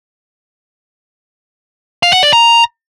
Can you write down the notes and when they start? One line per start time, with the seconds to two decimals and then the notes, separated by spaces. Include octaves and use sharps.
2.03 F5
2.13 F#5
2.23 D5
2.33 A#5